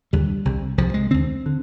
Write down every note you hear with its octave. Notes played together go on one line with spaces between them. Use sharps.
D#2 D3 G3
C2 C3
C2 C3 F3
G#3
D#2 D3 C4
D3